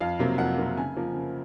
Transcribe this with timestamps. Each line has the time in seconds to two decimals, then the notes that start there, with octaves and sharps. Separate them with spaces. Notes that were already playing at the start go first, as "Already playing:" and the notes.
0.01 F2 F5
0.19 C3 F#3 A#3
0.38 F2 F#5
0.58 C3 F#3 A#3
0.77 C#3 G#5
0.96 F3 A#3
1.15 C#3